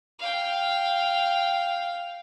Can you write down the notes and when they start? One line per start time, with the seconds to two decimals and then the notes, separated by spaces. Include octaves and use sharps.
0.19 F5 G5